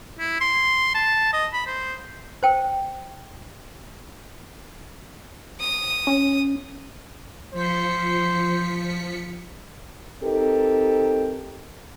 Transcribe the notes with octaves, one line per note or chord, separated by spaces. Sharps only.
E4
C6
A5
D#5
B5
C5
C5 G5
D#6
C#4
F3 C5 B6 C#7
C4 D#4 G4 A4 A#4